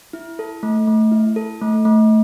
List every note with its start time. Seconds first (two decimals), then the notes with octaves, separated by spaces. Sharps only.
0.13 E4
0.39 A4
0.63 A3
0.87 A3
1.11 E4
1.36 A4
1.62 A3
1.85 A3